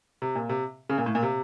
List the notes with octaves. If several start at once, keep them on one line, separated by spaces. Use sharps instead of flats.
C3
A#2
C3
C#3
A#2
A2
A#2
C3